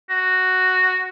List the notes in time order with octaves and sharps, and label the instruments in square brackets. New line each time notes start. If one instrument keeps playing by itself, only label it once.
[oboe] F#4